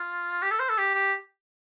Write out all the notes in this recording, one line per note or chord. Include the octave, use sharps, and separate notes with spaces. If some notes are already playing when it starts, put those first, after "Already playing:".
Already playing: F4
G4
A4
C5
A4
G4
G4